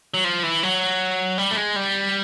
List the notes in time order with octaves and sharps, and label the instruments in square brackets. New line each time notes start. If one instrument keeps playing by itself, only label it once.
[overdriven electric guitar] F#3
F3
E3
F#3
G3
A3
G#3
G3